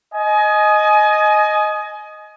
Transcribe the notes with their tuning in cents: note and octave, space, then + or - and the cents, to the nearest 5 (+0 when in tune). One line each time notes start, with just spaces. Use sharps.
D#5 +0 G#5 +30